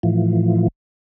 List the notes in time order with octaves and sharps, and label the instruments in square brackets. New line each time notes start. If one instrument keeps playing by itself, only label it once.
[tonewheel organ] A2 E3 F3